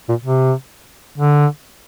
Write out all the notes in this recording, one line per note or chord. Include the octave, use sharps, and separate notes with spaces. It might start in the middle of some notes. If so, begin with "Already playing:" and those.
A#2
C3
D3